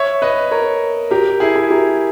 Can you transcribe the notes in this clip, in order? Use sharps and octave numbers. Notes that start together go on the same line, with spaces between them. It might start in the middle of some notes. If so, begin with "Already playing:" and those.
Already playing: C#5 E5
B4 D#5
A#4 C#5
G4 A#4
E4 G#4
E4 G#4
G4 A#4